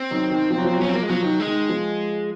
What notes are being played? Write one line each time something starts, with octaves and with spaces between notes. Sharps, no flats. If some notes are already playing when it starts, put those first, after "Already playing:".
Already playing: C4
D#3 F#3
D#3
F3
F#3
F3
F#3
F3 C#4
F#3 C4
F3 A#3
G#3
F3 F#3
D#3
G#3
D#3
F3